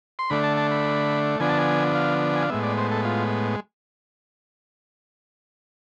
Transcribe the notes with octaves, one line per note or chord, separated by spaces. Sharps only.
C6
D3 A3 D4 B5
A5
A5
B5
D3 F3 B3 D4 G#5
A5
G#5
F5
G#5
F5
A2 G#3 B3 E5
D5
C5
A4
F4